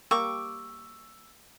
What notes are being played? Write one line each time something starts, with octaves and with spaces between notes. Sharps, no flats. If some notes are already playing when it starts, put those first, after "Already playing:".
G3 A#3 G4 C#6 D6 E6